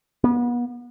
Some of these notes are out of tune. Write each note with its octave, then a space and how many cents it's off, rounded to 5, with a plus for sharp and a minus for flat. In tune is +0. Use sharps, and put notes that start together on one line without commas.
B3 -35